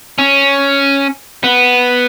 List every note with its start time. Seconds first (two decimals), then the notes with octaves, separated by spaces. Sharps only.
0.18 C#4
1.44 B3